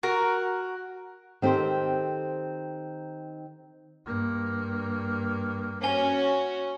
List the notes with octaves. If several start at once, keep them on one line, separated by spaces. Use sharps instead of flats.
F#4 A#4
D#3 C4 G4 A4 C5
G2 A#3
C#4 F#4 G#5 G7